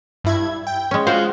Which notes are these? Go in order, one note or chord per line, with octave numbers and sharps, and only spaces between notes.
G2 E4 G#6
G5
G#3 C#4
G#3 F4 F#4 C5